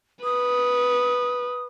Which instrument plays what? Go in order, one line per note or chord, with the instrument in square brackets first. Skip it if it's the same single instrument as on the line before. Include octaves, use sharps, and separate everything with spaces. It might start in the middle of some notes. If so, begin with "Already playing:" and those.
[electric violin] B4 [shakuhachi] D#6